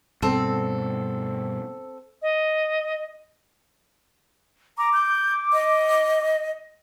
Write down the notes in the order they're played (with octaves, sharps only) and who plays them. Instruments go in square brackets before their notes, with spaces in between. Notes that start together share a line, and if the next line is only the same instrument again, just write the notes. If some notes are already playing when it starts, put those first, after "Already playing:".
[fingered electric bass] G2 B2 [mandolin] C4 A4
[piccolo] D#5
[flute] A#5 [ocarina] D6
[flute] G6
D#5